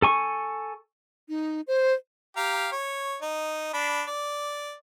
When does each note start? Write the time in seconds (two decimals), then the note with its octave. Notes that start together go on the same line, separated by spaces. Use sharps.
0.02 A4 G#5 C#6
1.29 D#4
1.67 C5
2.37 G4 F5 A#5
2.72 C#5
3.22 D#4
3.73 D4 B5
4.07 D5